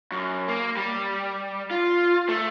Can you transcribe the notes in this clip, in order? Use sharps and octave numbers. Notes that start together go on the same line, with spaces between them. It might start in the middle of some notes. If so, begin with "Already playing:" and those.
F#2
A#3
G3
F4
A3